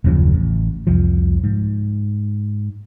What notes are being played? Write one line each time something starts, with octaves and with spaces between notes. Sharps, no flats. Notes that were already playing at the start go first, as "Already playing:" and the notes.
F#1 D#2 C#3 F3
A1
C2 F2 F3
G#2